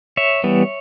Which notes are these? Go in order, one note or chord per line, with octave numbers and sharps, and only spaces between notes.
C#5 E5
E3 G3 B3